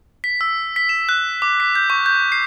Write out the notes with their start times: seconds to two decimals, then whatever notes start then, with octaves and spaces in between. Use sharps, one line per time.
0.24 B6
0.41 E6
0.76 B6
0.89 E7
1.09 F#6
1.42 D6
1.60 B6
1.75 G6
1.90 C#6
2.06 G6
2.32 C7